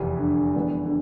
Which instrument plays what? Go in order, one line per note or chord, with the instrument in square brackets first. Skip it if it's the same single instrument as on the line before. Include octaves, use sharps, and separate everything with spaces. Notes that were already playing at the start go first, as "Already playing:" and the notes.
Already playing: [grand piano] F1 E2 C3 E3
[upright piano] D3
[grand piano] F2 E3 G#3 B3 D4
[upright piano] D3